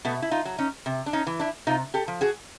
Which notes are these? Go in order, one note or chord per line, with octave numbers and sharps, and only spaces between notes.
B2 A3 B3
E4
D#4 F4
F#3
C#4 D#4
C3
D4
C#4 D#4
E3
D4 E4
C3 D#4 F4
G4 A4
F3
F#4 G#4